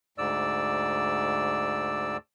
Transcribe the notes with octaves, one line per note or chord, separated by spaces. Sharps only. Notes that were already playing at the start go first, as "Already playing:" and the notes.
D2 G#2 D5 E6